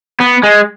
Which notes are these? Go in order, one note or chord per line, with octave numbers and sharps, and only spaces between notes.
B3
G#3